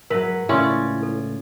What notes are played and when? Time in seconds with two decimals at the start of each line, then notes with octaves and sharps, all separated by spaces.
0.10 G#2 F#3 A#4 B4 E5
0.49 C#2 A2 C#4 E4 F4 D5 C6
1.03 A4